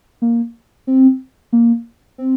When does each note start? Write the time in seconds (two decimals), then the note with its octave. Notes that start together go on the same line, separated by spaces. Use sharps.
0.22 A#3
0.87 C4
1.53 A#3
2.18 C4